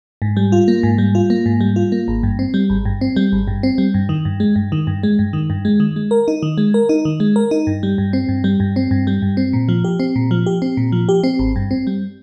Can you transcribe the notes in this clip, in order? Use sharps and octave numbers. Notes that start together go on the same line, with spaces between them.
G#2
G3
F4
A#3
G#2
G3
F4
A#3
G#2
G3
F4
A#3
G#1
G2
C4
G3
G#1
G2
C4
G3
G#1
G2
C4
G3
G2
D#3
G2
G#3
G2
D#3
G2
G#3
G2
D#3
G2
G#3
D#3
G#3
A#4
D#4
D#3
G#3
A#4
D#4
D#3
G#3
A#4
D#4
G2
G3
G2
C4
G2
G3
G2
C4
G2
G3
G2
C4
A#2
F3
G4
C4
A#2
F3
G4
C4
A#2
F3
G4
C4
G#1
G2
C4
G3